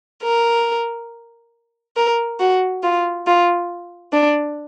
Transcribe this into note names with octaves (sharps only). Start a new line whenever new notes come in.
A#4
A#4
F#4
F4
F4
D4